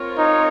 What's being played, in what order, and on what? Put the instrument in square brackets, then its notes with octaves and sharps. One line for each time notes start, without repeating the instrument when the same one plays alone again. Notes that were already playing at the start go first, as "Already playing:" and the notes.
Already playing: [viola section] C4 F4 A#4 C#5
[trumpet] D#4